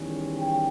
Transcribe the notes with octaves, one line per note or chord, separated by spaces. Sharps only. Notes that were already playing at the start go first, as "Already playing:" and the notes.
Already playing: E2 D#3 G3 C#4
G5